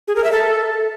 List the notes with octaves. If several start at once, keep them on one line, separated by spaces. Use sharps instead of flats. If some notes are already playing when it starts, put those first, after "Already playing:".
G#4
A#4
E5
A4